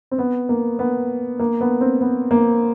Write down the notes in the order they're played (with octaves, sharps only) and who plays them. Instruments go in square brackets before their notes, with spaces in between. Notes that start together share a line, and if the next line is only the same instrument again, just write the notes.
[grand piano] C4
B3
A#3
B3
A#3
B3
C4
B3
A#3